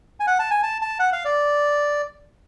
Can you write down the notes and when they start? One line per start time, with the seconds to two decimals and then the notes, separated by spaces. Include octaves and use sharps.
0.20 G#5
0.27 F#5
0.39 A5
0.51 G#5
0.63 A5
0.82 A5
0.99 F#5
1.13 F5
1.25 D5